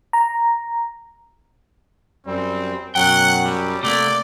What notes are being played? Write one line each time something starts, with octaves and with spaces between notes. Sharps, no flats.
A#5
F#2 G3 C4
F#2 B2 F#3 F#5 G5
G3
C3 A3 A#3 D5